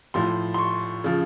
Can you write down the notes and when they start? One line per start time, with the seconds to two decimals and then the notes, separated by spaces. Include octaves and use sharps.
0.14 A2 F3 C6
0.54 C6
0.59 C#6
1.04 C#3 F3